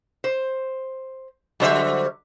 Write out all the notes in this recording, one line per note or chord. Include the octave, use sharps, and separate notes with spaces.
C5
D3 F#3 G3 C5 E5